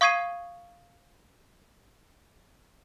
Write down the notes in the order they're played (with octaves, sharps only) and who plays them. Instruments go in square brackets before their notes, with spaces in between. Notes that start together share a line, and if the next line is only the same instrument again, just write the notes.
[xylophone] F5 C#6 D#6 G#6 C7 D#7